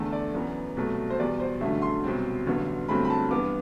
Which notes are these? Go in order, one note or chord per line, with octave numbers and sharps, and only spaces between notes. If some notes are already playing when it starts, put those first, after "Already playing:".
Already playing: E2 D3 A3 A4
D5
F#2 E3 B3
C2 B2 F#3 A3
C5
E2 B2 G3 D5
C5
A1 G2 D3 F#3 A3 E5
C6
C2 B2 F#3 C4
A1 G2 D3 F#3 B3
G1 G2 F#3 A3 C4 B5
B5
A5
G2 E3 B3 D6